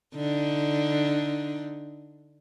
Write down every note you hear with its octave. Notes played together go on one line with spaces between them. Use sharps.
D3 D4 D#4